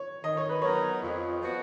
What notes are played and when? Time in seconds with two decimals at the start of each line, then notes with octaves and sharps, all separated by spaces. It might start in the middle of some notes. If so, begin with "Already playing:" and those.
Already playing: C#5
0.24 D#3 D#5
0.37 C#5
0.49 B4
0.62 F#3 B3 D#4 A#4 C#5
1.02 F2
1.41 F3 B3 F#4